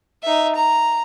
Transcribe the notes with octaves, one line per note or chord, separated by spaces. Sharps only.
D#4 E5
A#5